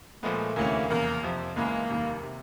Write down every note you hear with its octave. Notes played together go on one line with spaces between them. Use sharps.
A#2 F3 G#3 A3 B3
D2 C3 E3 A3 A#3 C#4
F1 E2 C#3 A#3
F2 C3 F3
C#2 C#3 E3 G#3 A#3 B3
F1 D#2 D#3 G3
C3